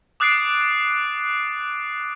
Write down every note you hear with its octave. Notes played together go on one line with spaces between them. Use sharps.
D6 D#6 F#6 A6 C7 D7